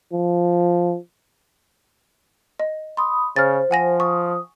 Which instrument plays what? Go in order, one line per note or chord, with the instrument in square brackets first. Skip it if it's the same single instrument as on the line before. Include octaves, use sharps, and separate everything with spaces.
[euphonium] F3
[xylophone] D#5
[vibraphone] B5 D#6 [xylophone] C6
[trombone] C#3 [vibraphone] C5 [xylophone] F6 A6
[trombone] F3 [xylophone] F#5 G#5 A#6
[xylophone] C#6 [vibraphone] D#6